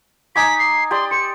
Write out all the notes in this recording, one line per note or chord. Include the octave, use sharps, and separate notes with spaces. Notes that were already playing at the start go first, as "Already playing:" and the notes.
D#4 G#5 D6 B6
C7
G4 D5 C6 D#6
C5 C#7